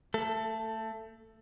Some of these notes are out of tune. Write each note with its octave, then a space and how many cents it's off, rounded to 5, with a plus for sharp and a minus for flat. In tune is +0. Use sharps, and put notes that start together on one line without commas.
A3 +25 A4 +0